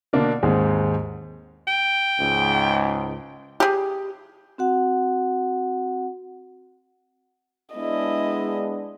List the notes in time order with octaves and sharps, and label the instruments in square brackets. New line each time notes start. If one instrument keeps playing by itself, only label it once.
[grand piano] B2 D3 A#3 D4 A#4
D#2 G#2 D#3 G#3 C4
[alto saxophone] G5
[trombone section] C#2 G#2
[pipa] G4 G#4
[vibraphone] C4 F#4 F#5
[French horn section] G#3 B3 D4 [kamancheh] E4 D#5